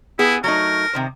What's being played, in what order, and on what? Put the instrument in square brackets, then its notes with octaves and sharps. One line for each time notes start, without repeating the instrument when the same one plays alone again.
[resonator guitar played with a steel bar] B3 G#4 [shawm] E4
[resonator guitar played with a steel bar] F#3 A3 D#4 [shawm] A#4
[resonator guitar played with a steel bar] C3 D#3 C5